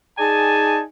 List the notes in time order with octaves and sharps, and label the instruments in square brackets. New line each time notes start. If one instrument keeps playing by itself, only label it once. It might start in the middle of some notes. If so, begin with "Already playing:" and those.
[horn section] D#4 G#4 D5 G#5 A5